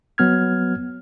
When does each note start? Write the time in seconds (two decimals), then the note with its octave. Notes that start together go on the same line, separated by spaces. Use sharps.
0.18 F#3 B3 F6 G#6